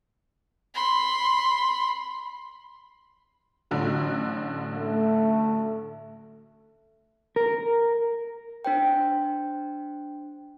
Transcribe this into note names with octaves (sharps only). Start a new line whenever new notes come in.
B5 C6
A1 D3 F#3
A3
A#4
D4 C5 G5